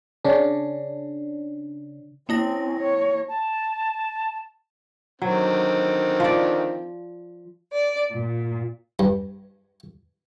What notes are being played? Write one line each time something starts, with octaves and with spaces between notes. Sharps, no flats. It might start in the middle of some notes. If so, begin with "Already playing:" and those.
C#3 C#4 D4
A#3 C4 C#4 E4 A#6
C#5
A5
D3 D#3 F#3 C4
F3 D5
D5
A#2
G2